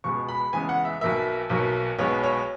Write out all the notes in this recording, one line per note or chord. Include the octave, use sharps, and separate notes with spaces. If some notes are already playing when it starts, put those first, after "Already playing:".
C#2 B2 G#3 B3 C#6
B5
E2 C#3 G#3 B3 G#5
F#5
E5
B1 B2 A#3 E5
B1 B2 F#3 A#3
B1 B2 G#3 B3 C#5
C#5